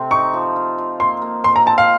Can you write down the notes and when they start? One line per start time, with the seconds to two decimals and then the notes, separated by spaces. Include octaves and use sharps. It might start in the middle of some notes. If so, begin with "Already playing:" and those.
Already playing: C3 A3 C4
0.11 D#4 C#6
0.34 F3
0.56 F4
0.78 F4
1.00 A#3 C6
1.22 A#3
1.44 A4 C6
1.56 A#5
1.66 C4 A5
1.78 F5